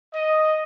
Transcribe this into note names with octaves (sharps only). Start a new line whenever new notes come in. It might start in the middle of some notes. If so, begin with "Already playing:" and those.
D#5